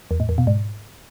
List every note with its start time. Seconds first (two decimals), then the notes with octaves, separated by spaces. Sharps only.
0.11 E2
0.20 A2
0.29 E2
0.38 B2
0.47 G#2